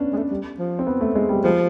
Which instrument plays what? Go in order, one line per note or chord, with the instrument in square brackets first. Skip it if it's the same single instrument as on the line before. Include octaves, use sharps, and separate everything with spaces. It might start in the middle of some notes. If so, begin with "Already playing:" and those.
Already playing: [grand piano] B3 C#4 D4
[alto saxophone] G#3
A3
G3
F3
[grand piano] C4
B3
A3
G#3
G3
[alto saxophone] F3 [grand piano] G#3